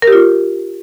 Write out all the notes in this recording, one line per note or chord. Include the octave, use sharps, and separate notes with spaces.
A#4
G4
F4